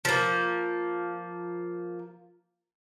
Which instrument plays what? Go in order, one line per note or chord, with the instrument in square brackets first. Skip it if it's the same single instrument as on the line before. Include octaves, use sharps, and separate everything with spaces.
[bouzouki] F3 A#3